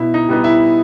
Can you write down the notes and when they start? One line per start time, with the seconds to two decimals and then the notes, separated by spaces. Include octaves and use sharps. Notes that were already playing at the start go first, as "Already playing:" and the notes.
Already playing: B2 E4
0.14 D#4
0.29 G3 B3 D#4
0.44 E4